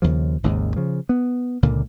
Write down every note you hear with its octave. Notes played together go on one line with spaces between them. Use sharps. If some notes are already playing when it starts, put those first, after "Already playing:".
D#2 C#3 F3
G#1 D#2 G#2 C#3
C#3 F3
B3
C#2 A#2 D3 A#3